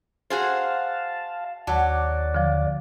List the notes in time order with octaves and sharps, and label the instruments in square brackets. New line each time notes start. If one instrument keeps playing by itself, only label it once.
[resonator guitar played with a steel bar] F#4 G#4 C5 [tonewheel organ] F5 A5
[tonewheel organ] D#2 D5 [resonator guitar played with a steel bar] F#3 [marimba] F#5 A5
[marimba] D3 F3